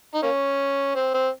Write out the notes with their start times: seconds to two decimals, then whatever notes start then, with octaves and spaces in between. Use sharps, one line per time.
0.14 D#4
0.23 A#3 C#4
0.95 C4
1.14 C4